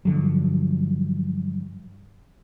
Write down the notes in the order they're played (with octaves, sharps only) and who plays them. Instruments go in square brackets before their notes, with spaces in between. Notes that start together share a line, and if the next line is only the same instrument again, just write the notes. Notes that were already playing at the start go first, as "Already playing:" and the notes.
[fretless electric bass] G2 D3 F3 F#3